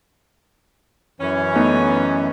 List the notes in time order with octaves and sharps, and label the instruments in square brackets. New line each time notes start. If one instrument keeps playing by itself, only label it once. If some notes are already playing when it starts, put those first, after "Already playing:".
[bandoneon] F#2 E3 [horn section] C#4
[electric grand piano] A3 B3 D#4